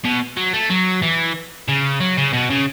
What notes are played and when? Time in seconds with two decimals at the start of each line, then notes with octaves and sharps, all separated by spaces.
0.04 B2
0.37 F#3
0.53 A3
0.70 F#3
1.02 E3
1.69 C#3
2.00 F#3
2.18 C#3
2.33 B2
2.50 C#3